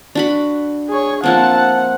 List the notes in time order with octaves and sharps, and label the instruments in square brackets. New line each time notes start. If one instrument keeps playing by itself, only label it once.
[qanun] D4 F#4 B5
[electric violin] G#4 C#5
[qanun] F3 A#3 C4 [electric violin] F#5 A5
[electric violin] F#5